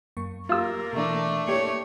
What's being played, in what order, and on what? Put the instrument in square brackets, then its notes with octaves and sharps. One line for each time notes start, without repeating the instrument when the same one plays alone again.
[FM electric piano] F#2 A#3 C#6
[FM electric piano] F#3 G4 [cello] A#3 [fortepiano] F4 E6
[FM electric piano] B2 E3 [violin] A3 D4
[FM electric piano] A#3 E4 [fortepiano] G4 [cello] C#5